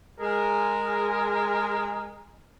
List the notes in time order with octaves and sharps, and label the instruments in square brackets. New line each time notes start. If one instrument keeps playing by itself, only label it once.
[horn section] G#3 G#4 A#4